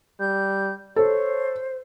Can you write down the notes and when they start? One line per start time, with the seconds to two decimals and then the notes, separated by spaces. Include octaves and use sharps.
0.20 G3 G6
0.96 A4 C5 C#5